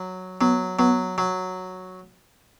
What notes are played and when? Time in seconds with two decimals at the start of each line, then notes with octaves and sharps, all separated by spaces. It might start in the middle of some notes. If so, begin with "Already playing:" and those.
Already playing: F#3
0.41 F#3 B3
0.79 F#3 B3
1.18 F#3